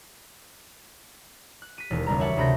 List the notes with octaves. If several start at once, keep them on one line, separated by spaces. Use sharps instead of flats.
F#6
B6 D#7
E1 D#2
F#1 G3 A#5
C#5 E5 F#5 A5
D2 C3 B5 G6 A#6